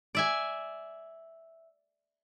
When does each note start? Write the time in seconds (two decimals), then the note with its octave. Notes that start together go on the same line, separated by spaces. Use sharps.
0.15 D5 E5 G#5